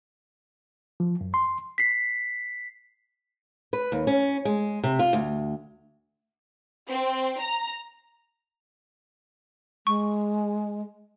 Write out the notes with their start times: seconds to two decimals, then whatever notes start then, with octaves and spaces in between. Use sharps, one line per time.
1.00 F3
1.21 F#2
1.34 C6
1.78 B6 C7
3.73 B4
3.92 D#2
4.07 C#4
4.45 G#3
4.84 C3
4.99 F4
5.13 D2
6.89 C4
7.39 A#5
9.87 G#3 C#6